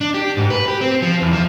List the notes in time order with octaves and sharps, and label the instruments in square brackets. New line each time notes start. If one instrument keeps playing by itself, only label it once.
[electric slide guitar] D4
G4
G#2
B4
G4
C4
F3
E2
F3